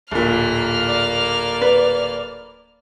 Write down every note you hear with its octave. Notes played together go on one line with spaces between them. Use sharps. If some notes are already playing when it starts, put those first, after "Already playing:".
D1 A#2 A#3 F6
D5
B4